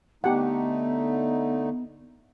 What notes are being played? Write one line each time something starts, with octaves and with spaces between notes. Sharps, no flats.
D3 A3 B3 D#4 G4 F#5